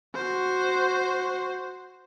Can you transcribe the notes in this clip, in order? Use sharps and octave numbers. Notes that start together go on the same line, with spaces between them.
F#4 C5